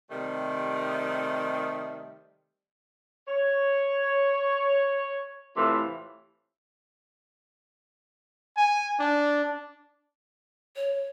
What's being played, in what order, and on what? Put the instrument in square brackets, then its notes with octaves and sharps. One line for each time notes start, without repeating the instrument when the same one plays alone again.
[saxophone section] C3 D#3 G3 A3
[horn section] C#5
A2 C3 E3 A3 F4
[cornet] G#5
D4
[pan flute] C#5